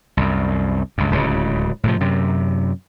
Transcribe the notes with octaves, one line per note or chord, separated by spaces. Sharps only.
C2 F#2
C#2 G2
D1 C#2 C#3
A2 C3 F3
F#2 C3